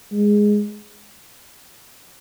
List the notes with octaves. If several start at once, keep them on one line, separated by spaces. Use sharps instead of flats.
G#3